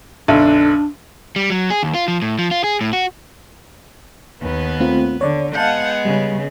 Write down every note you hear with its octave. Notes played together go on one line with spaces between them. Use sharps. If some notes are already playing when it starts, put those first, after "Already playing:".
B1 F#2 D3 D4
G3
F#3
G#4
D#2
F4
F3
A2
F3
F4
G#4
A2
F#4
D#2 A#3 B3 B4
A3 C4 F4
D3 C#5 D5
G#3 B3 F5 F#5 A5 G6
C#3 G3